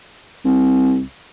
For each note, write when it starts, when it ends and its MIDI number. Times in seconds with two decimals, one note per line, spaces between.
0.45 1.02 36